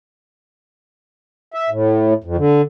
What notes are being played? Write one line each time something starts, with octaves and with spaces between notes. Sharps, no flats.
E5
A2
F2
D3